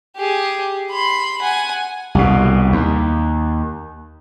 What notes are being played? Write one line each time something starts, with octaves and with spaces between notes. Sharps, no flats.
G4 G#4
B5 C6
F#5 G#5
C2 B2
D#2